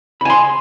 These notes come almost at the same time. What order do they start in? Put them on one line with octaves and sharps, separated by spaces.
B5 G#5 C6